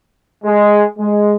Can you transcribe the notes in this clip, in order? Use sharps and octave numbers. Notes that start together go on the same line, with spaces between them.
G#3 G#4
G#3